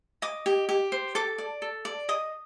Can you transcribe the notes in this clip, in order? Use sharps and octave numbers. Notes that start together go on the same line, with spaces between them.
D#5 D6
G4
G4
C5
A4 D6
D5
A4
D5
D#5 D#6